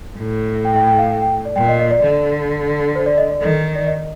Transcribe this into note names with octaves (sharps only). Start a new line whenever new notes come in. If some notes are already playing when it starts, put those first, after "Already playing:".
A2
G5
G5
G5
F5
G5
G5
D5
A#2 G5
D#5
D#5
D5
D3
C5
D5
D#5
D5
D#3 A4
D5
D#5